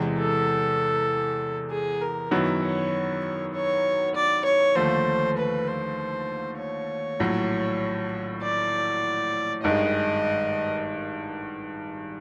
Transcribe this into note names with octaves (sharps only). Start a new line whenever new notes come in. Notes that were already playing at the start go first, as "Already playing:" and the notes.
Already playing: E2 C3 E3 G#3
A4
G#4
A#4
F#2 D#3 F#3 B3 E4
C#5
C#5
D5
C#5
D#2 D3 F3 A3 C5
B4
C5
C#5
A#1 A2 F#3
D5
G#1 G2 D#3 G#3 D#5